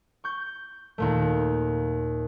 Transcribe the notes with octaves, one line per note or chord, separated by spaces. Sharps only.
C#6 G6
D#2 A#2 A3